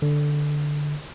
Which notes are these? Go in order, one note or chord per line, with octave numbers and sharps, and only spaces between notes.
D3